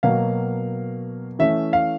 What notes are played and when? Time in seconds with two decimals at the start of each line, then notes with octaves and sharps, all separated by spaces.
0.03 B2 F#3 A#3 F5
1.39 E3 A3 C#4 E5
1.73 F5